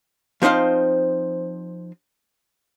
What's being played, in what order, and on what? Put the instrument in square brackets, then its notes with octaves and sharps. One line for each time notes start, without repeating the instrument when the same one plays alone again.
[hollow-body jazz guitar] F3 C4 D#4 C5 F5